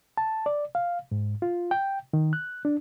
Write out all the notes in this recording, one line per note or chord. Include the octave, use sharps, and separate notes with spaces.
A5
D5
F5
G#2
F4
G5
D#3
F#6
D4